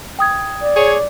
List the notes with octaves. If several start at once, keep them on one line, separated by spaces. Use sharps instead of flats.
G5 D#6 G#6
D5
G#4 C#5